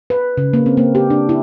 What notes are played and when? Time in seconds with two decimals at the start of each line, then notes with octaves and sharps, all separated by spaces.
0.10 B4
0.37 C#3
0.53 A#3
0.66 C4
0.77 A#3
0.95 G4
1.10 D4
1.29 E4